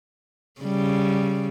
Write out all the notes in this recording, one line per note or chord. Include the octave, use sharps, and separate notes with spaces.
C#3 G3